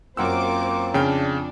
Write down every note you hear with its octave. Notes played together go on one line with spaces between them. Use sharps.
F#2 A#3 C4 F4 C5 F#5 D6 E6
F2 C#3 D4 G5 F6